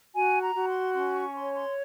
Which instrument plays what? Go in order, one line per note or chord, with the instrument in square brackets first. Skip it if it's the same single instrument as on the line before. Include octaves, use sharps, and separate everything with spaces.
[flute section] F#4 G#5
A#5
F#4
C6
C#4 C6
C#6
C#5 C6
C6